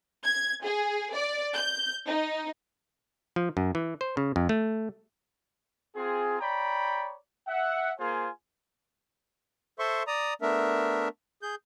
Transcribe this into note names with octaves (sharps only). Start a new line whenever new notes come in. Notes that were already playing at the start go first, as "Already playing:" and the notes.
G#6
G#4
D5
G6
D#4
F3
F#2
E3
C5
C#3
F2
A3
C4 F4 G#4
C#5 D5 G5 A#5 B5
E5 F#5
A#3 F4 G#4 C5 G#5
A4 C5 E5 C6 C#6
D5 A#5 D#6
A3 B3 D4 A#4 E5
G#4 G6